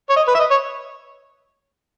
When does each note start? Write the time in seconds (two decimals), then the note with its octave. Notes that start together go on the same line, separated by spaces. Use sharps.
0.09 C#5
0.16 D#5
0.28 B4
0.34 E5
0.39 D#5
0.50 C#5